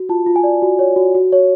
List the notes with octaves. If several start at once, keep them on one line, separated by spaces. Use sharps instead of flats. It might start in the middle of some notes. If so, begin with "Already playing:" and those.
Already playing: F#4
F4 A5
F4
G#5
D5
F#4
C#5
F#4
F#4
C#5